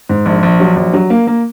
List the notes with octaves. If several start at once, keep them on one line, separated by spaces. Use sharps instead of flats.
G#2
A#1
A#1
F#3
A#1
F#3
A#3
A#3